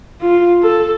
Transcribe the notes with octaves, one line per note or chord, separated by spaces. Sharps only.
F4
A4